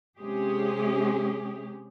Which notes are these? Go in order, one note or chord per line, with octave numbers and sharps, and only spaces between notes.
C3 G#3 C#4 G4 G#4